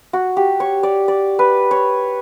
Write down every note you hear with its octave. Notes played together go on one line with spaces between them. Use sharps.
F#4
G4
C#5
D5
D5
B4
C#5